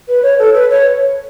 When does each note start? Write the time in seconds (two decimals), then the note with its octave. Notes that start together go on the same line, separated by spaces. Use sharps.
0.08 B4
0.23 C#5
0.39 A4
0.55 B4
0.70 C#5